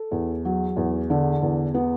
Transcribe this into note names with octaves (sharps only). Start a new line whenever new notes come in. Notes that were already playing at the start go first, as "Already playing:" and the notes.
Already playing: A4
E2
F#3
E2
D3
E2
B3